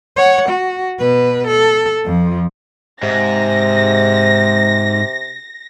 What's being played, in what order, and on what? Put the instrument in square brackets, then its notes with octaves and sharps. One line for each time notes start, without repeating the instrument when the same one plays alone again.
[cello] C#5 F#5
F#4
B2 B4
A4
F2 F3
[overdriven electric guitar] G#2 [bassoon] C3 [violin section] A#6